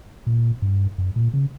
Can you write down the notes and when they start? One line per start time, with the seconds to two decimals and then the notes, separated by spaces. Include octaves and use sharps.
0.27 A#2
0.62 G2
0.98 F#2
1.16 A#2
1.34 C#3